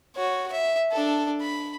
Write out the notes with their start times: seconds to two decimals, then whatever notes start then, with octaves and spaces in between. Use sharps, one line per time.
0.16 F#4 C#5
0.52 E5
0.91 D4 A4
1.41 B5